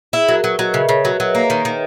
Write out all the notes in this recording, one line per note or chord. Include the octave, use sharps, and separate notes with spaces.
E4 G#4
F#3 A#4
A#4
F#3 B4
F#3 D#5
C#3 E5
C#3 C#5
F#3 B4
F#3
A#3
D#3
D#3